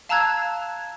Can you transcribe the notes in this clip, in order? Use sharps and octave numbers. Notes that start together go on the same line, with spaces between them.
F5 A5 A#5 E6 F#6 G#6